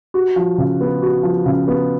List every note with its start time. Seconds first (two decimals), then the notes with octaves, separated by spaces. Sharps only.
0.14 F#4
0.36 F3
0.58 C#3
0.81 B3
1.02 F#4
1.23 F3
1.46 C#3
1.68 B3